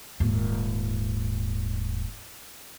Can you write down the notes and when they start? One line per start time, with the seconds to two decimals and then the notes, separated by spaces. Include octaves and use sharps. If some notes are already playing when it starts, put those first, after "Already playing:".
0.20 D#1 G#2